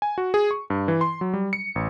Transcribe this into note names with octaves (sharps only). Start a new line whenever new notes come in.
G#5
F#4
G#4
C#6
G2
E3
C6
F#3
G3
C#7
A1